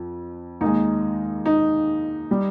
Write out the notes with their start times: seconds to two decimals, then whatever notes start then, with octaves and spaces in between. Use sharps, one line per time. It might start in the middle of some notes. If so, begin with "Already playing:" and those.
Already playing: F2
0.61 D#2 D#3 G#3 D#4
1.46 D#4
2.31 G3